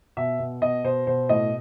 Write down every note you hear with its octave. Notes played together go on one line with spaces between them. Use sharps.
B2 E5
B2
B2 D#5
B2 C5
B2 C5
A2 D#5